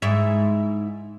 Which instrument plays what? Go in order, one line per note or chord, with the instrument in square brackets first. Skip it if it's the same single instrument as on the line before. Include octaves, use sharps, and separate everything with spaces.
[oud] G#2 E4